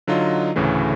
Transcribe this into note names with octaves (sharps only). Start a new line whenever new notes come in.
D3 F#3 D#4 F4 D#5
D2 A2 C#3 E3 A3